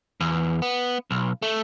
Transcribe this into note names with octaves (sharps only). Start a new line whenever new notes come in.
E2
B3
B1
A3